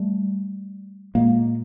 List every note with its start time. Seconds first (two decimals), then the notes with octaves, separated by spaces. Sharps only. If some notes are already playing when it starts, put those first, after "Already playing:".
Already playing: G3 A3
1.15 A#2 G#3 A#3